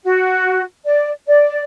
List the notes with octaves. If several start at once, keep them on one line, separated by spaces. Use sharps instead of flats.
F#4
D5
D5